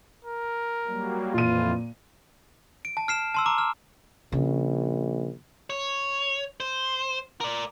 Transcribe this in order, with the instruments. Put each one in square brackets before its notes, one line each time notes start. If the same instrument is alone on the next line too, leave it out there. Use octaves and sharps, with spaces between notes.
[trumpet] A#4
[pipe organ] F#3 G3 A#3
[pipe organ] F2 E3 [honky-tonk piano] A#2 D#7 [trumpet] F4
[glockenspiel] D7
A5
F6 C7 E7
A5 C6 E6
A#5 D6
F6
[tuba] A#1 [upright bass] C#3
[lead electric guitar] C#5
C5
A#4 D5